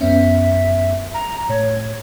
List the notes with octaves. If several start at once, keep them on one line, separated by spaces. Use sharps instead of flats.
F#2 B3 C#4 E5
A#5
A2 C#5